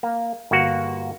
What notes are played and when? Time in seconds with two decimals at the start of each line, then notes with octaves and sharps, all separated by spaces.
0.03 A#3
0.51 G1 A#3 F#4 F#5